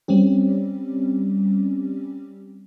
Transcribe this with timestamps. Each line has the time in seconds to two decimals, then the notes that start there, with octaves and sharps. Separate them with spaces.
0.08 G3 C4 C#4 G4